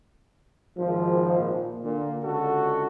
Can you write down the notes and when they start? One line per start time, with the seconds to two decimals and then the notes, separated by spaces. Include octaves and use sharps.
0.78 G#1 F3
1.38 A#2
1.84 A#2 D3
2.23 C#2 F#4 A4